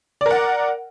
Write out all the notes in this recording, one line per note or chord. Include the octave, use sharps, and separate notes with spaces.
A#4 D5 F#5